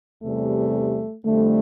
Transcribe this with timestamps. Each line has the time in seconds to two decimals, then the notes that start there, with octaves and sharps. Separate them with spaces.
0.22 E2 C3 G3 A3
1.25 F2 D3 G3 A3